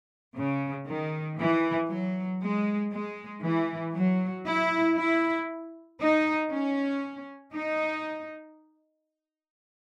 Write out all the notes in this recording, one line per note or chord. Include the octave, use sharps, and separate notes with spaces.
C#3
D#3
E3
F#3
G#3
G#3
E3
F#3
E4
E4
D#4
C#4
D#4